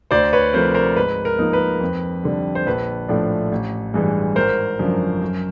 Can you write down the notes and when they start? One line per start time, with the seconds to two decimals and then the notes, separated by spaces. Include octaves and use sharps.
0.11 D2 C5 D5
0.33 B4 C#5
0.53 C3 F3 A3 A#4 C5
0.74 A#4 C5
0.96 G#2 B4
1.25 A#4
1.39 F3 A#3 D#4
1.53 B4
1.81 F2
2.24 D3 G3
2.55 C5
2.66 A#1 B4
3.09 A2 F3 A3 D4
3.52 A1
3.94 G2 E3 G#3
4.36 G#1 A#4 C5
4.79 F#2 D3 F3
5.22 F#2